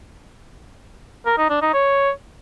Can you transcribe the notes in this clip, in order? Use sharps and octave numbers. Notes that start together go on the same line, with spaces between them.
A#4
D#4
D4
D#4
C#5